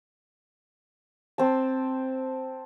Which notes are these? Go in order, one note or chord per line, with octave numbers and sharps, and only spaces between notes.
C4 A5